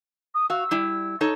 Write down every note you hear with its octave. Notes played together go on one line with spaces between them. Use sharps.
D#6
F#4 F5 E6
G3 E4
D#4 A4 C#5